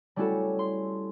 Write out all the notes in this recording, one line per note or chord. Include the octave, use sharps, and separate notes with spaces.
G3 A3 C#4 E4 F#4 A4
C6